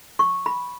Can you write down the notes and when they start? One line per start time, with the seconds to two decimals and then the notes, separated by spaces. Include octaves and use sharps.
0.19 C#6
0.46 B5